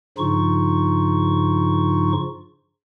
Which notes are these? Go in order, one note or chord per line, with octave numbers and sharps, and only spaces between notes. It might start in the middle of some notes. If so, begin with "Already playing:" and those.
G2 C#3 F3 D#4 F4 C#6